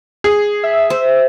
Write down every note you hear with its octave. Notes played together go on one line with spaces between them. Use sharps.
G#4
E5
C5